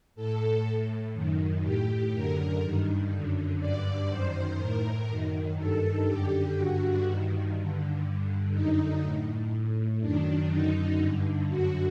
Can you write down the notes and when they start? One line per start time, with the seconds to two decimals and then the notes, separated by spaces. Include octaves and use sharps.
0.15 A2 A4
0.65 A2
1.14 F#2 D#3
1.63 A2 G4
2.13 F#2 D3 A#4
2.61 G2 D#3
3.11 D3
3.16 F#2
3.60 G2 D3 D5
4.09 F#2 D#3 C5
4.58 A2 A#4
5.08 F#2 D#3
5.58 G2 D#3 A4
6.07 F#2 D3 G4
6.56 G2 D3 F#4
7.05 G2 D#3
7.55 G2 D3
8.04 G2 D3
8.53 F#2 D3 D#4
9.02 A2
9.51 A2
10.01 F#2 D#3 D4
10.50 F#2 D3 D#4
11.00 G2 D3
11.48 F#2 D3 F#4